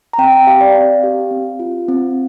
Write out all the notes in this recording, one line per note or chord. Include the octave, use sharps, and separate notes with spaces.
A#5
C4 G5
G5
G4 F5
D5
C4 F5
G4
C4
F4
C4